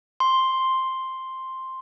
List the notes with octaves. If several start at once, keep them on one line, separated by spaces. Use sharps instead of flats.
C6